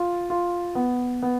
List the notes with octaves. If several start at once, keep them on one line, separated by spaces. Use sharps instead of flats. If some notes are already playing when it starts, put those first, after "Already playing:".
Already playing: F4
F4
B3
B3